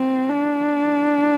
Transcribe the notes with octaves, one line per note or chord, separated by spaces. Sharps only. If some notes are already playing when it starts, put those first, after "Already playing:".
Already playing: C4
D4